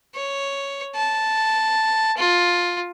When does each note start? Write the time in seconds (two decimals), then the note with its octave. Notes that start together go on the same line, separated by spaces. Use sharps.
0.15 C#5
0.95 A5
2.17 F4